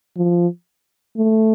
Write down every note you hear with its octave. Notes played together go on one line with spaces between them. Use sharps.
F3
A3